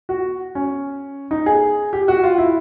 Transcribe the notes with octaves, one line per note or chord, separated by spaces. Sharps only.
F#4
C#4
D#4
G#4
G4
F#4
F4
E4